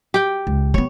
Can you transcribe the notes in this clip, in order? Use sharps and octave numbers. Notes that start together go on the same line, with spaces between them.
G4 G5
C#2
G3 B3 C#5